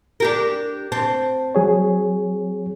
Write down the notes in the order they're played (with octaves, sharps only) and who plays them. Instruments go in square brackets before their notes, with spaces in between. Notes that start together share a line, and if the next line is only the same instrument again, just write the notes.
[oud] D4 G4 A#4
[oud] C4 [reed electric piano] A5
[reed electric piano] F#3 G#4 C#5